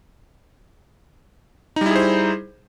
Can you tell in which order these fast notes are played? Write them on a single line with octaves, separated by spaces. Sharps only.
D#4 G3 E4 G#4 C5